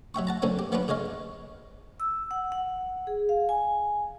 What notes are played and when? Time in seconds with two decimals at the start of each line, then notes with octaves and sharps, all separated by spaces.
0.14 F#3 E5 G5 C#6
0.27 F#5 A5 A#5
0.42 D3 F#3 A#3 C4 C#4
0.59 G4
0.72 A#3 B3 C#4 D4 F4 B4
0.88 D3 G#3 C#5 D#5 F5
2.00 E6
2.31 F#5
2.52 F#5
3.07 G#4
3.29 F5
3.49 G#5